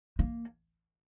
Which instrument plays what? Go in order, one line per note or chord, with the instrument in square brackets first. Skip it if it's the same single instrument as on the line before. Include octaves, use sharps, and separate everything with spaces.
[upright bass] A#3